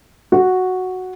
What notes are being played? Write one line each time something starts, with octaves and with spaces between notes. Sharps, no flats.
F#4